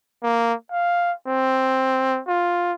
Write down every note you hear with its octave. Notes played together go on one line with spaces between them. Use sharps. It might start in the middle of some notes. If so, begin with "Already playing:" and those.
A#3
F5
C4
F4